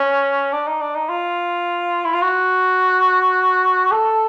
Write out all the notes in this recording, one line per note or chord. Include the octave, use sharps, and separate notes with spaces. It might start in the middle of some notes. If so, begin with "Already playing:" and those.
Already playing: C#4
D4
D#4
D4
D#4
F4
E4
F4
F#4
A4